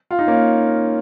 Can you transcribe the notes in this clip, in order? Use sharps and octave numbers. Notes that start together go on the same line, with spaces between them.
F4
D#4
A#3 C#4